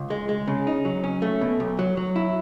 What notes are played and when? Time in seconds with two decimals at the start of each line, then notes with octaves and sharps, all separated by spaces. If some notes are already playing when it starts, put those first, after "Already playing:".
Already playing: C#2
0.10 G#3
0.29 G#3
0.48 C#3
0.67 D#4
0.85 F#3
1.04 C#4
1.22 A3
1.41 B2
1.60 B1
1.79 F#3
1.97 F#3
2.16 E4